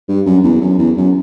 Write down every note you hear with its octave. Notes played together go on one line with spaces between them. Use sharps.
G2
F#2
E2
F#2
E2
F#2